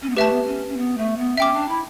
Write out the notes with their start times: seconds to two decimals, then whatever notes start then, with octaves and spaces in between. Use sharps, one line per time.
0.02 C#4
0.09 B3
0.16 A3 G4 B4 E5 A5
0.32 B3
0.43 B3
0.47 C#4
0.69 C#4
0.77 B3
0.97 A3
1.17 B3
1.37 C#4 E5 G5 D6
1.53 D4
1.68 E4